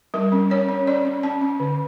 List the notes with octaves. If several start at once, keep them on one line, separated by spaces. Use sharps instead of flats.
G3 A#4
C#4
C#4 C#5
C#4
C#4 D5
C#4
C#4 A5
C#4
D3